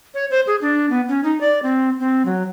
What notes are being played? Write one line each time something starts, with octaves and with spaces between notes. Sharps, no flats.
C#5
C5
G#4
D4
B3
C#4
D#4
D5
C4
C4
F#3